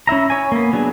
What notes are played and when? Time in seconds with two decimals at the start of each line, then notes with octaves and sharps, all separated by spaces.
0.07 C#4 E4 E5 A#5
0.30 C#5 G#5
0.52 A#3 B3
0.73 F#3 B3 D4 G#4